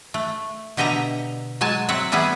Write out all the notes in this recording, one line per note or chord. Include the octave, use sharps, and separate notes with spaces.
A3
B2 D3 G4 D#5 E5 A#5
F#3 G#3 G#5 A5
F#3 C4 E5 F#5
E3 G3 B3 E4 G#4